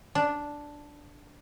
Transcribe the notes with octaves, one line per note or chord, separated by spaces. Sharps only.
D4